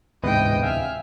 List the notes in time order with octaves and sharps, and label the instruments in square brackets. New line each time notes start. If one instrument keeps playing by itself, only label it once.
[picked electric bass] D1 E2 C3 [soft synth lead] G#2 [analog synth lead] B4 [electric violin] D#5 G5
[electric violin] E5 F6 [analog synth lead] F5 [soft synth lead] G#5